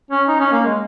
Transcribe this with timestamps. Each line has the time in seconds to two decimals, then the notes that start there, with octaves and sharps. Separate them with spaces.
0.11 C#4
0.28 D#4
0.40 C#4
0.52 A#3
0.65 G#3